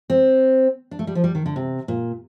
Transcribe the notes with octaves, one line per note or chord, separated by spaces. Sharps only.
C4
D4
A3
G3
F3
G3
D#3
D3
C3
A#2